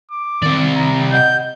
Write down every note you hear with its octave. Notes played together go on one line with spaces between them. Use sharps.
D6
C3 D#3 D5
A#5
D#5 F#5 G6